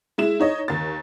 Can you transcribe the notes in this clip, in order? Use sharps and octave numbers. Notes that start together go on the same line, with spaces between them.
G#3 E4 E7
D#4 C#5 D#5
D#2 A6